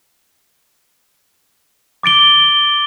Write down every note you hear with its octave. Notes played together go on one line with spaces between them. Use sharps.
D6 A6 D7 G7